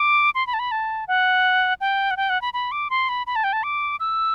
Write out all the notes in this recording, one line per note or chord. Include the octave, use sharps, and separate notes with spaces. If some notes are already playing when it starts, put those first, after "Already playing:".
Already playing: D6
C6
B5
A5
B5
A5
F#5
G5
F#5
G5
F#5
B5
B5
D6
C6
B5
B5
A5
G5
A5
D6
E6